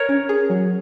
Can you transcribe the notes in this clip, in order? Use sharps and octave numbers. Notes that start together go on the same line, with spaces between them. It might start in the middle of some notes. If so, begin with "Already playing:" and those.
Already playing: A#4 C#5
C#4
G#4
F#3